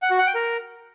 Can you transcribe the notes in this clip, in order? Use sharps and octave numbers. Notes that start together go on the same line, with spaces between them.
F#5
F#4
F#5
G5
A#4